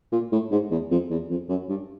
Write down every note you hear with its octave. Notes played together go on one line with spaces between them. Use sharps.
A#2
A2
G#2
E2
F2
E2
F2
F#2
G2